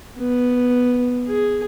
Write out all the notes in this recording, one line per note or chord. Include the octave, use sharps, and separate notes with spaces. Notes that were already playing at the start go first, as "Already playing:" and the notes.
B3
G#4